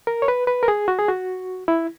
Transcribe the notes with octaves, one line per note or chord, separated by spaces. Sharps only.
A#4
C#5
B4
B4
A#4
G#4
F#4
G#4
F#4
E4